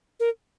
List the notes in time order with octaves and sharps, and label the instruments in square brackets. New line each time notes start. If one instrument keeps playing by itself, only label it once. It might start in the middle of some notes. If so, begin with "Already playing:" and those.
[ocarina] A#4